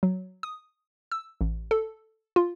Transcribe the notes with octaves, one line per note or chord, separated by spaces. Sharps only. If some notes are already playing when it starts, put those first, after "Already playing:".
F#3
D#6
E6
A1
A4
F4